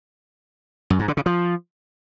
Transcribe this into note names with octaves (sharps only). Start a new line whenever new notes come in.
F#2
G#2
D3
C#3
F3